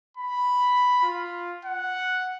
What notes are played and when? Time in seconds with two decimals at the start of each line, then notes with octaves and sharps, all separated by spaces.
0.17 B5
1.03 F4
1.65 F#5